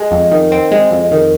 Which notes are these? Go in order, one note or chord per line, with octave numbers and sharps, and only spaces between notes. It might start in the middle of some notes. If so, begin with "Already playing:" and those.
Already playing: G#3
F2
D#3
C4
G#3
F2
D#3